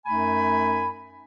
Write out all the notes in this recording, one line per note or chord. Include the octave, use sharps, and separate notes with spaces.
F#2 A3 D#4 G#5 B5